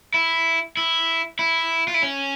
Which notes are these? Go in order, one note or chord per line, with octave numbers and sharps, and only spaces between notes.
E4
E4
E4
F4
E4
C#4